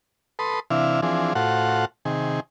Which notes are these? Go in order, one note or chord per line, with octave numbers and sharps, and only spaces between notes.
A4 B4 C6 D#6
C3 E3 D4 E4 F5
E3 F3 C4 D4 G#4
A2 F4 F#4 A4 C5 F#5
C3 D#3 G#4